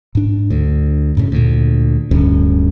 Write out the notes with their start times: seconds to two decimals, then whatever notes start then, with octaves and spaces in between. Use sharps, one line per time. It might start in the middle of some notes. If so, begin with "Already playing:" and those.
0.15 G#2 D4
0.50 D2
1.17 F#2 A2 C#3
1.32 D2 A#2
2.11 D1 D2 G2 C#4